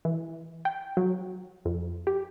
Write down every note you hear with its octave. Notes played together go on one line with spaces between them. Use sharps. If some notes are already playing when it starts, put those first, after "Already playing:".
E3
G5
F#3
F2
G4